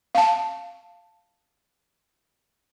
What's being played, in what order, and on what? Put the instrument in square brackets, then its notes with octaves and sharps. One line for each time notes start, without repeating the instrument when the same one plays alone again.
[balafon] F5 A5